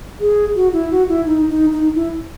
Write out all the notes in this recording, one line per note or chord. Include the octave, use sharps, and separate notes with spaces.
G#4
F#4
E4
F#4
E4
D#4
D#4
D#4
E4